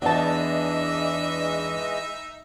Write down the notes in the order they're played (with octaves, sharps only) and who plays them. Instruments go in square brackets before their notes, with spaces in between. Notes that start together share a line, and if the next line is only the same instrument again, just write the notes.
[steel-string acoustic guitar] E2 A5 [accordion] E3 G#3 D#5 [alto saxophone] D4 [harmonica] D#4 E5